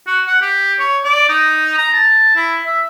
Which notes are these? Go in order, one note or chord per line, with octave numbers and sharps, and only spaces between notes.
F#4
F#5
G4
C#5
D5
D#4
A#5
A5
E4
E5